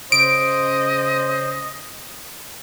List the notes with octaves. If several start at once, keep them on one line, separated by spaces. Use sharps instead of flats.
C#3 C5 D#5 D7